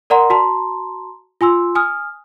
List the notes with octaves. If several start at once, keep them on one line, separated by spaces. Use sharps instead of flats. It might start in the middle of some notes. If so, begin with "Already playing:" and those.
A#4 D5 F#5 A#5 C6
F#4 A5 A#5 C6
F4 G#5 C6 E6
G#5 D#6 F6